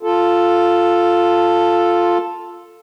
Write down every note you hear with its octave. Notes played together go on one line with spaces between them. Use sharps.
F4 A4